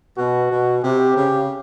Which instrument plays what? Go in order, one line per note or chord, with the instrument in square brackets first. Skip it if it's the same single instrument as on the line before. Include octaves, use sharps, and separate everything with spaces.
[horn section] B2 [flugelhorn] F#4
[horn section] B2
[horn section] C3 [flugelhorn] G4
[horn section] C#3